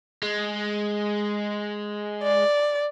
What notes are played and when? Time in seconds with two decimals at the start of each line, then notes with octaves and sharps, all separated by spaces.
0.23 G#3
2.23 D5